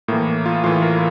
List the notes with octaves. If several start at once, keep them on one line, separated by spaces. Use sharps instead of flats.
A2 E3 A#3
F4
A2 E3 F4
A#4